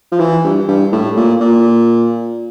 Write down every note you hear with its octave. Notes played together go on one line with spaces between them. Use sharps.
F3
E3
G2
G2
A2
A#2
A#2